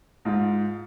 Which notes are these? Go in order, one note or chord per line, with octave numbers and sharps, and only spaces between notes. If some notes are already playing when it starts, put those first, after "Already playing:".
G#2 G#3 F4